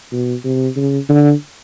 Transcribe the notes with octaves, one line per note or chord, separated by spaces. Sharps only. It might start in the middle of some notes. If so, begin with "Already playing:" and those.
B2
C3
C#3
D3